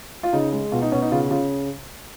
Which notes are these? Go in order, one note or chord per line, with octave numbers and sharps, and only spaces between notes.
F4
C#3 D#4
G#3
B2 F4
D#4
B2 C#4
D#4
C#3 F4
C#3 F4